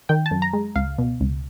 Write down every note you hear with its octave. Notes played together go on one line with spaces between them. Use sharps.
D#3 G5
A5
F#2
A#5
G#3
C#2 F5
B2
C#2